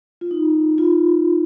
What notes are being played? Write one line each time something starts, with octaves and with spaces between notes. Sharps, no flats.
F4
D#4
F4